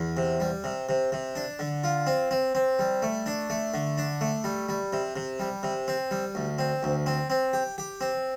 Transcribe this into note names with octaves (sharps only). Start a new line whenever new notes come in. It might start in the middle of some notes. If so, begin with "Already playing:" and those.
Already playing: E2
C3
G3
C3
C3
C3
D4
D3
F4
C4
C4
C4
G3
A3
D4
A3
D3
D4
A3
G3
G3
C3
C3
G3
C3
C4
G3
D2
C4
D2
C4
C4
G4
G4
C4